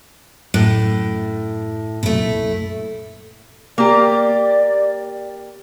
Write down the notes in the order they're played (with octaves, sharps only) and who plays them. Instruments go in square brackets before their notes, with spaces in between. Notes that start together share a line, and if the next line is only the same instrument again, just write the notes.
[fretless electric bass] F#2 [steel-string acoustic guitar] A2
[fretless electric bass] C2 F#2 A#2 [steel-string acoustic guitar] A3 E4
[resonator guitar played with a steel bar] A#3 G4 [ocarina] D5